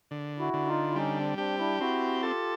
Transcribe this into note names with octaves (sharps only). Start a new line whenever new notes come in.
D3
E4 F#4
D3
D#4 F4
E4
G3 C#4 D#4
C4 D4
C4 D4 G4
D4 E4
C4 E4 F#4
F4 G4 A4